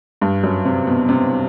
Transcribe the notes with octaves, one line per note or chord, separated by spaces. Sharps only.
G2
F#2
C3
B2
C3